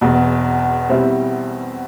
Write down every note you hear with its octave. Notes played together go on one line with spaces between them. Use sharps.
E1 E2 B2
B2 G3 C4 E4